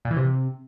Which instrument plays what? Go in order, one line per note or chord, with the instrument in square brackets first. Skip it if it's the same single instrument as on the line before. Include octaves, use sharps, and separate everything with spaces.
[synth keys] A#2
E3
C3